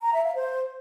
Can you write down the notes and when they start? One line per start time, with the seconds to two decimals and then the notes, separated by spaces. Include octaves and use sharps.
0.02 A#5
0.13 E5
0.24 F5
0.35 C5